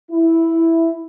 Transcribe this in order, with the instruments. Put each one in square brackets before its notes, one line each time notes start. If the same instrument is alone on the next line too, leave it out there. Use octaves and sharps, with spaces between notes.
[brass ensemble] E4